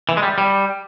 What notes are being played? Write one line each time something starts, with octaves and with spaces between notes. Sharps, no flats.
E3
G#3
G3
G3